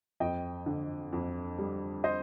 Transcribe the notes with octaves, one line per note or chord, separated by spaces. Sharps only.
F2 D#5 G5
D3
F2
G3
C5 D#5